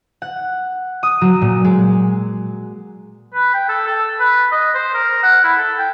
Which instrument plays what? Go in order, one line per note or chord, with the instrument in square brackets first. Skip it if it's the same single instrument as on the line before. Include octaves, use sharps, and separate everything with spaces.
[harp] F#5
D#6
F#3
A#2
G#3
[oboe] B4
G5
A4
A4
B4
D#5
C5
A#4
F#5
E4
A4
G5